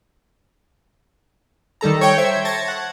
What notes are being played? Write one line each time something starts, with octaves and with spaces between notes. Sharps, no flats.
D#3 G3 A4 A#5
C#5 G5
C5 E5 G#6
A5 C#6 G#6 A#6
F#5